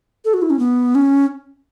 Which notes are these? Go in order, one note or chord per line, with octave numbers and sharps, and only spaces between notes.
A4
F#4
E4
C#4
B3
C#4